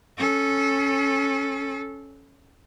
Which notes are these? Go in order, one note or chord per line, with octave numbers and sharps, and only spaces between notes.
C#4 A4